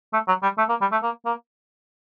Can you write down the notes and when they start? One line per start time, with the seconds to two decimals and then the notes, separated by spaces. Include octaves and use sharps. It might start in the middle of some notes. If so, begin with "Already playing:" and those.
0.13 A3
0.28 F#3
0.43 G3
0.58 A3
0.69 A#3
0.81 G3
0.92 A3
1.03 A#3
1.26 A#3